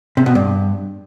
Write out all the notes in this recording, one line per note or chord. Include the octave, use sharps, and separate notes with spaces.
C3
B2
G2